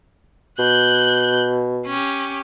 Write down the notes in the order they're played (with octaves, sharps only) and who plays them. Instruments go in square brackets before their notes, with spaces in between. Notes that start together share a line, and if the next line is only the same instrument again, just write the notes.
[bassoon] B2 [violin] F#6 G6
[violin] C#4 G4